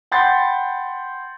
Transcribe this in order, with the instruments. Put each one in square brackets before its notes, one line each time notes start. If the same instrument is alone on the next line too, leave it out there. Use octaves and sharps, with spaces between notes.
[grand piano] F#5 G5 B5 C6 G6 A6